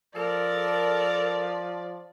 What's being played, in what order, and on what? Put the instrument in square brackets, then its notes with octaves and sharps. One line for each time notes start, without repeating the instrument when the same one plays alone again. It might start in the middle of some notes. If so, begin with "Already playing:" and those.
[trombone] F3 [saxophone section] A4 A#4 [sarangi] D5